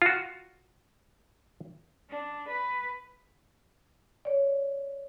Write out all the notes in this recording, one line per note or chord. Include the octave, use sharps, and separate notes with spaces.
F4 F#4
D4
B4
C#5 D5